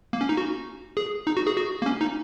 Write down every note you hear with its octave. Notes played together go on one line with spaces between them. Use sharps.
A#3
C#4
D#4
F#4
G#4
D#4
F#4
G#4
F#4
A#3
C#4
D#4